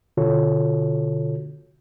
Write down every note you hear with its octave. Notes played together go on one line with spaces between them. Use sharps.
B2 D3 F4 F#4 A4 C#5